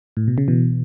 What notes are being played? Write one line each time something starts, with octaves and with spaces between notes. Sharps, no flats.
A2
B2
C#3
B2 E3